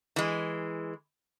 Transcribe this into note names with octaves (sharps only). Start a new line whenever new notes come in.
E3 G#3